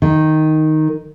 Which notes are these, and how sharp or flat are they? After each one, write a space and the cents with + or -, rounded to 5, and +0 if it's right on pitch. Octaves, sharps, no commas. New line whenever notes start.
D#3 +0